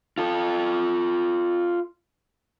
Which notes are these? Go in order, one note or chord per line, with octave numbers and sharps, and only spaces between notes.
F4 A4